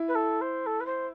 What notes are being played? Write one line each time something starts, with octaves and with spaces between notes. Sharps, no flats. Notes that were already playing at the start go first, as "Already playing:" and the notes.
Already playing: E4
B4
A4
C5
A4
B4
C5